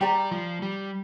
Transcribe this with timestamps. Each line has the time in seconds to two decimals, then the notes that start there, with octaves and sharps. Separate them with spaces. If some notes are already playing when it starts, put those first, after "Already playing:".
0.01 G3 G4 D5 A#5
0.31 F3
0.62 G3